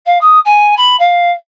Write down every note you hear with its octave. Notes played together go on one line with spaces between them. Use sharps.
F5
D#6
G#5
B5
F5